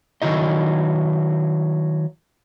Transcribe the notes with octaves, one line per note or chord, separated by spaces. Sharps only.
D#3 F#3 E4 D#5